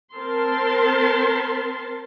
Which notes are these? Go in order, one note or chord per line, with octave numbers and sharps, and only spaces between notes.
C4 A#4 A5 C6